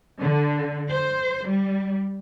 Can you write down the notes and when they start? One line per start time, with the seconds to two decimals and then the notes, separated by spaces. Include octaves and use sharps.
0.20 D3
0.89 C5
1.48 G3